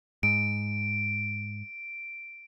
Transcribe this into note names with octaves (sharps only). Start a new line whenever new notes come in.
G#2 D7